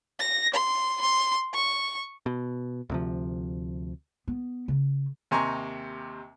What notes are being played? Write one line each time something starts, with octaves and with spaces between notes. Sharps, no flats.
A#6
C6
C6
C#6
B2
D2 C3 F3
B3
C#3
D#2 C3 G#5 A#5 C6 C#6